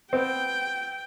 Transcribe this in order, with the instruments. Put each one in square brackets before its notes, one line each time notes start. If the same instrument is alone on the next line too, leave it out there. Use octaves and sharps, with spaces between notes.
[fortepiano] B3 C4 [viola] G5